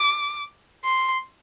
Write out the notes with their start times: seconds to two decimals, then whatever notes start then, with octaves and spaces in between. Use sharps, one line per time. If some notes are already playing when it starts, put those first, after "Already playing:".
Already playing: D6
0.85 C6